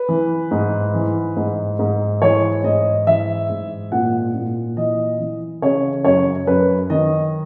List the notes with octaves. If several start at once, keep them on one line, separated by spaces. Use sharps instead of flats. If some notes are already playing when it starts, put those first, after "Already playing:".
Already playing: B4
E3
G#2
E3
G#2
G#2
E3 C#5
G#2 D#5
E3 E5
G#2
A#2 F#5
A#2
E3 D#5
E3
C#3 C#5
F#2 C#5
F#2 B4
D#3 D#5